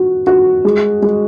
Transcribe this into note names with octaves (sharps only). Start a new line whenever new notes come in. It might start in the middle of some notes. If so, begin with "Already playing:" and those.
Already playing: F#4
F#4
G#3
G#3